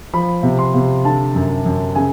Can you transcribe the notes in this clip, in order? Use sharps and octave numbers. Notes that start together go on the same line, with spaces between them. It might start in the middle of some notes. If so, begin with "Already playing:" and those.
F3 B5
C3
C6
C3
D3 A5
F#2
F#2
C#3 G#5